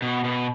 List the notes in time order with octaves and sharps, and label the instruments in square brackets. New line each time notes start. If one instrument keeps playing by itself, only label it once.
[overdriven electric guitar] B2
B2